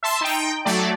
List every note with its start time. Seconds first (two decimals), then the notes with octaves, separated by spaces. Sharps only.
0.03 E5 A5 C6
0.21 D#4 G5
0.65 F#3 A3 D5